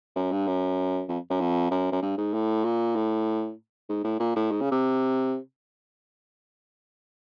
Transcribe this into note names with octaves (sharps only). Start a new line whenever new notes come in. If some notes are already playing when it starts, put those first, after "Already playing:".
F#2
G2
F#2
F2
F#2
F2
F#2
F#2
G2
G#2
A2
A#2
A2
G#2
A2
A#2
A2
G#2
C#3
C3